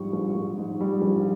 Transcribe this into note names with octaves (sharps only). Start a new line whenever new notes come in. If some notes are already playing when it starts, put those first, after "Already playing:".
Already playing: A#1 G#2 G3 C#6
A#1
A#1
G#2
G3
A#1